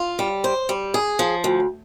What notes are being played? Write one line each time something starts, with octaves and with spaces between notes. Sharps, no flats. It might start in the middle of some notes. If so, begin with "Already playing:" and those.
Already playing: F4
G3
C5
G3
G#4
F3
D2